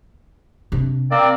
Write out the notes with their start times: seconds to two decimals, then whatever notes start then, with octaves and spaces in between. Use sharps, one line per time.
0.72 C3 D4
1.11 A#3 C4 D5